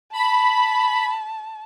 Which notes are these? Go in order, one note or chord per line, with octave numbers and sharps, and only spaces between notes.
A5 B5